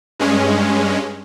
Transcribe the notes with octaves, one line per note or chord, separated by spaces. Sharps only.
G2 G#3 C#4